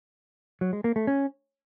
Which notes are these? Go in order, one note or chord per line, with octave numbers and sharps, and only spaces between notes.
F#3
G#3
A#3
A3
C#4